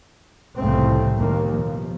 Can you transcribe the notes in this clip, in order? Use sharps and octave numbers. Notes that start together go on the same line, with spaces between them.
C2 F2 A2 C#3 A3 C4
D#2 A#3
B2 F3